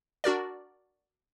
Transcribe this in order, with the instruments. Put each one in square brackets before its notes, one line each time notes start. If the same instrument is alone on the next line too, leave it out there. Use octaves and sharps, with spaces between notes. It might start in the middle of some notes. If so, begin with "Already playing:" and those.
[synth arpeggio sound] D4 F#4 A#4 D5